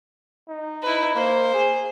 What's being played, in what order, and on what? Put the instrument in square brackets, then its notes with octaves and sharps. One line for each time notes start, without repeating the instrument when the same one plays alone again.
[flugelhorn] D#4
[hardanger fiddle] E4 B4
[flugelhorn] A#3 [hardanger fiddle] C5
[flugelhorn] G#4